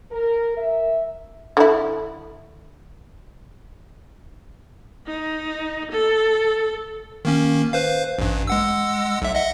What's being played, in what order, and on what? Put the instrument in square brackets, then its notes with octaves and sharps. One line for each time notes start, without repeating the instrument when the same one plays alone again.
[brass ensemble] A#4
E5
[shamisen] D3 E4
[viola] D#4
A4
[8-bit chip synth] D#3 A#3 C#4
B4 C5 F5
A1 G2
G#3 F#5 E6
B1 E5
D#5 E5 F#5